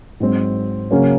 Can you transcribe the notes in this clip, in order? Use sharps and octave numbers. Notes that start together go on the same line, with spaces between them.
G#2 F#3 C4
C#3 F#3 A#3 C#4